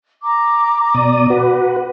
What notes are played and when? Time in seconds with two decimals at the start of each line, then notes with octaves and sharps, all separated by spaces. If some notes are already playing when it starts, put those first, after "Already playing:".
0.23 A#5 D6
0.95 B2 D5 D#6
1.30 F#4 B4